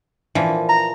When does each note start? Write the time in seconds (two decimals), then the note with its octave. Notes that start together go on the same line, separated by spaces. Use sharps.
0.35 A#2 E3 F3
0.69 A#5